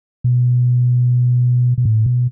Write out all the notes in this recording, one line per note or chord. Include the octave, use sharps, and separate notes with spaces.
B2
B2
A2
B2